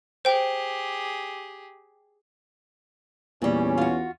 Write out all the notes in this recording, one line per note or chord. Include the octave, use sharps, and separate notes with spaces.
G4 G#4 C5 G5
E2 A#2 G3 C#4
F4 F#4